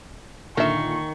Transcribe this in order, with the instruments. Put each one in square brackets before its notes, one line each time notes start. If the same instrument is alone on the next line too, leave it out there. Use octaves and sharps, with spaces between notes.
[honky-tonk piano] A#2 D3 [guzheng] D#3 [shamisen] A#4 E5 [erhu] C#6